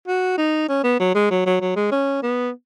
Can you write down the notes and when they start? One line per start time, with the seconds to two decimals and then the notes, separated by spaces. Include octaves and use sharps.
0.07 F#4
0.38 D#4
0.69 C#4
0.84 B3
0.99 F#3
1.15 G#3
1.31 F#3
1.46 F#3
1.61 F#3
1.76 G#3
1.92 C#4
2.23 B3